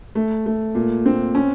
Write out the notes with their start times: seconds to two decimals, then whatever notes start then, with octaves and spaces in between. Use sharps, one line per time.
0.15 A3
0.46 A3
0.75 A#2
1.06 C4
1.35 C#4